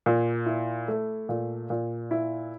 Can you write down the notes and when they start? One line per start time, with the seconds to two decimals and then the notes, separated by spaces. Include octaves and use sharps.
0.06 A#2
0.46 E4
0.88 A3
1.29 A#2
1.70 A#2
2.11 E4